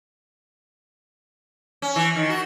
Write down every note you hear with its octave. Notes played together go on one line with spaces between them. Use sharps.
C#4
E3
D#3
F#4